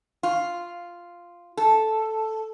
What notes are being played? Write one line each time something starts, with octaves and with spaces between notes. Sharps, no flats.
F4
A4